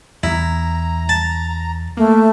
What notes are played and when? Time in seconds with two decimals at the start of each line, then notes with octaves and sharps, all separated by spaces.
0.23 E2 E4 A#5
1.09 A5
1.97 A3 A#3